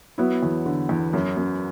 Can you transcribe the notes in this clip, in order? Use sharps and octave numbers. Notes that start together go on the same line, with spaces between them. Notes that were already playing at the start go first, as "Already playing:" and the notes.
F#3 B3 E4
E2
D3
E2
F#2
F#2